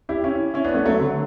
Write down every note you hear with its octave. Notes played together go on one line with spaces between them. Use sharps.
E4 G4
C#4 E4
C#4 E4
B3 D4
A3 C#4
F#3 A3
D3 F#3